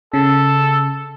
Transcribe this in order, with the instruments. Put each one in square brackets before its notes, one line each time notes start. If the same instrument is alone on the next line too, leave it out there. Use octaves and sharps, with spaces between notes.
[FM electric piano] C#3 [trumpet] A4